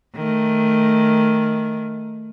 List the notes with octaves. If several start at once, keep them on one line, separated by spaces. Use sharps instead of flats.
D#3 A3